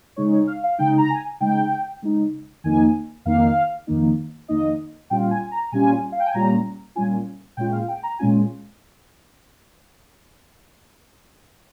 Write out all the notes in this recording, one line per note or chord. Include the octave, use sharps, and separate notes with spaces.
C#3 G#3 D#4 C#5
C#5
F5
F5
C#3 G#3 D#4 G5
A#5
G#5
C#3 G#3 D#4 G5
C#3 G#3 D#4
F2 D#3 A#3 D#4 G#5
F2 D#3 A#3 D#4 F5
F2 D#3 A#3 D#4
F2 D#3 A#3 D#4 D#5
A#2 G3 C#4 F4 G5
G#5
A#5
A#2 G3 C#4 F4 G#5
F5
G5
G#5
A#2 G3 C#4 F4 A#5
A#2 G3 C#4 F4 G#5
A#2 G#3 C#4 F4 G5
F5
G5
A#5
A#2 G#3 C#4 F4 G#5